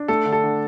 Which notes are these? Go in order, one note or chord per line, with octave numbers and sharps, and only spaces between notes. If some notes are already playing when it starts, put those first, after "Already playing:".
Already playing: D4
A3 A4
D3
A4
D3